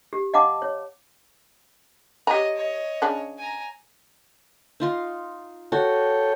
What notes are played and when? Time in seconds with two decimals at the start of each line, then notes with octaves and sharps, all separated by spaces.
0.13 G4
0.34 D#5 F5 F#5 A5 D6
0.62 C#5
2.27 G4 C#5 D#5 A#5
2.56 C#5 D#5
3.02 C#3 D4
3.37 G#5 A#5
4.80 D#4 F4 C6
5.72 F#4 A4 C#5 G5